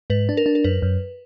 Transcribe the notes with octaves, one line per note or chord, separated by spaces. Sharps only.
G#2 B4
D4
A#4
D4
A#4
F#2 B4
F#2